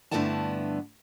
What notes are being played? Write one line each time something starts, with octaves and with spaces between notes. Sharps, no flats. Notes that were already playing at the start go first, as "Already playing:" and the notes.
G2 D3 A3 B3 E4 A5